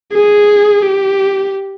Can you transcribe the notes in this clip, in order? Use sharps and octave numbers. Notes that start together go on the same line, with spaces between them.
G#4
G4